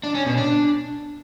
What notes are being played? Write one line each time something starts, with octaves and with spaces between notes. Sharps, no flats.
D4
C#4
B2
D4